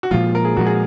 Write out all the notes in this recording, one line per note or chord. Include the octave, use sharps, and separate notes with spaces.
F#4
A#2 F3 G#3 F4
A#4
G#4
A#2 F3 G#3 F#4
G#4